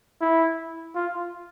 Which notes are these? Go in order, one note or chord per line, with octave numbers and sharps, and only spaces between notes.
E4
F4